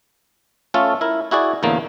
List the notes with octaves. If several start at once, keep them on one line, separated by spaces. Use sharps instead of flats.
A3 C#4 F4 A4
E4 A#4
E4 F#4 G#4 D5
E2 A2 D3 A#3